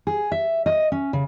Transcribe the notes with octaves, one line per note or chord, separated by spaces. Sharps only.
G#4
E5
D#5
C#4
C#3